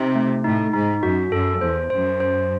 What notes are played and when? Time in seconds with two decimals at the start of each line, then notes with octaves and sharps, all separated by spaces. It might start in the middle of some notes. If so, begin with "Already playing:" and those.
Already playing: C3 D#4
0.15 A3
0.44 A2 D#4
0.73 G#2 D#4
1.03 F#2 F#4
1.32 F#2 A4
1.61 E2 C5
1.90 F#2 C5
2.20 C5